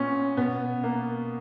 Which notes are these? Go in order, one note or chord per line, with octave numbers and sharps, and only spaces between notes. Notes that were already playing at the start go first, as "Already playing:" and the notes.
Already playing: A#2 B3 C#4
B2 B3
A#3